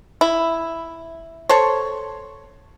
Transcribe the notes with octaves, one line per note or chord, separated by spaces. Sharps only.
E4
A4 C5 C#5